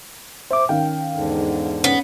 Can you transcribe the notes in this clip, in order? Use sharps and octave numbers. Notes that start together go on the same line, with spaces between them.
C5 E5 D6
D#3 C#4 F5 G5
E2 G#2 D3
B3 C#4